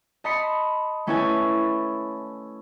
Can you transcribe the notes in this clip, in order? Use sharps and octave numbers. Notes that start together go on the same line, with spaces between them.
D#5 A5 B5 C6 D#6 C#7
A3 C#4 E4 A4 B4 G#5